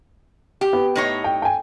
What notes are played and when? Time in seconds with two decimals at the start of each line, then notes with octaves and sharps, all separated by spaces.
0.61 G4
0.73 B3
0.96 A2 D#4 C#5
1.24 G5
1.42 G5 G#5